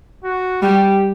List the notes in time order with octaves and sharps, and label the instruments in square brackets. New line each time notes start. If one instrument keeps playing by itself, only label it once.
[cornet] F#4
[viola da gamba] G3 [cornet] G4